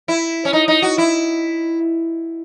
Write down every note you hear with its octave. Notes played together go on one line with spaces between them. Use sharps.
E4
C#4
D#4
D#4
F#4
E4